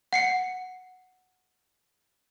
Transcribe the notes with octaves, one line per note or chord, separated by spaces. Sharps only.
F#5 C7 C#7